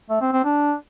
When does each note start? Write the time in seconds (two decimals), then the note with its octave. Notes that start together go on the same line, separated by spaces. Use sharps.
0.10 A3
0.21 C4
0.32 C4
0.44 D4